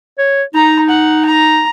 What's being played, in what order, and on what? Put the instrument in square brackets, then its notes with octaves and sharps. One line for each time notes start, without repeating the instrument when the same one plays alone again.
[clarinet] C#5
[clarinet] D#4 [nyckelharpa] A#5
[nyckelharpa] F#5
A#5